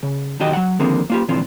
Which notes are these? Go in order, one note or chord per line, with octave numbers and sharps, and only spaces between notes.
C#3
B1 E2 D#3 F#4 G4 D#5
F#3 F#5
D3 D#3 F3 A#3 C4 G#4
A#3 F4 G4
A#2 D3 E3 F3 C4 F4